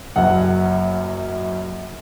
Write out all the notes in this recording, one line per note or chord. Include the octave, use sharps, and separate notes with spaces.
F#1 F#2 F#5